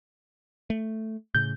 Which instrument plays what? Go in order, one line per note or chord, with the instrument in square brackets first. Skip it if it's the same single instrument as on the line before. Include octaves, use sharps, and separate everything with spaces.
[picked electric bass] A3
[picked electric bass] A2 C#3 [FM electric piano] G6